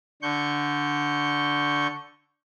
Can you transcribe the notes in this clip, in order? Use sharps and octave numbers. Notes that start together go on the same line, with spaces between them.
D3 C#6 G6